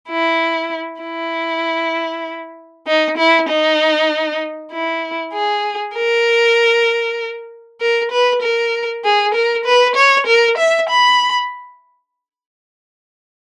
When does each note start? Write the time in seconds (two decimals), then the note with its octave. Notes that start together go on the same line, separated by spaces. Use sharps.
0.09 E4
1.02 E4
2.87 D#4
3.17 E4
3.49 D#4
4.72 E4
5.34 G#4
5.95 A#4
7.81 A#4
8.11 B4
8.42 A#4
9.04 G#4
9.34 A#4
9.65 B4
9.96 C#5
10.27 A#4
10.58 E5
10.89 B5